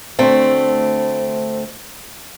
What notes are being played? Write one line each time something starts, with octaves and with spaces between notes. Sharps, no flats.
D2 A3 C4